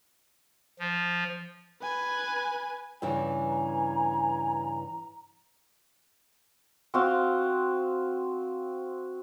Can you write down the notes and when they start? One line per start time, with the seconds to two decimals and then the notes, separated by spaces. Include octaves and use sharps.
0.79 F3
1.82 B4 G#5
3.02 G2 C#3 E3 G#5
3.49 A#5
6.94 C4 F#4 F5